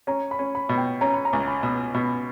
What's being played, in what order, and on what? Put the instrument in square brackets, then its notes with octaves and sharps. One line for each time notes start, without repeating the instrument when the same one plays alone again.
[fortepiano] C#4 [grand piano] A#5
[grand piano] B5
[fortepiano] C#4
[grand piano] B5
[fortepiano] B2
[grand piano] G5
[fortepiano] C#4 [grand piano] A#5
[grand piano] B5
A#5
[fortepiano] C#2
[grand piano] B5
[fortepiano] B2
[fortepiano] B2 [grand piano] B5